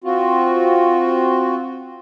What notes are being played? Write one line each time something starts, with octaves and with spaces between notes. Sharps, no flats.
C4 F4 F#4